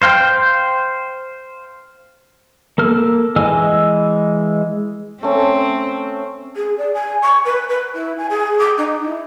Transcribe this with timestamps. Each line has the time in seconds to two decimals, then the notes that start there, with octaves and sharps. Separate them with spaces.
0.02 C5 F5 G5
2.78 A#3 A4 F6
3.36 E3 G#3 D#5 G#5 E6
5.23 A3 C4 C#4
6.55 G#4
6.78 D5
6.94 G#5
7.22 C#6
7.45 B4
7.69 B4
7.93 E4
8.17 G#5
8.29 G#4
8.58 D6
8.77 D#4
9.04 E4